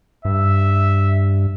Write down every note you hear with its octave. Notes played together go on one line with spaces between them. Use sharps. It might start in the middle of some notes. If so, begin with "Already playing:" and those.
G2 E5